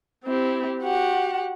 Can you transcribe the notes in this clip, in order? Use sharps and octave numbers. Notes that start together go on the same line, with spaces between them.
C4 E4 G4
F#4 G4 F#5